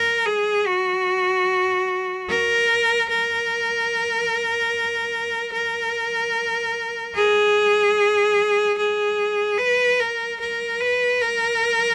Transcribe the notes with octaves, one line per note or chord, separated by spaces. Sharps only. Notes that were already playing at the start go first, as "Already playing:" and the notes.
Already playing: A#4
G#4
F#4
A#4
A#4
A#4
G#4
G#4
B4
A#4
A#4
B4
A#4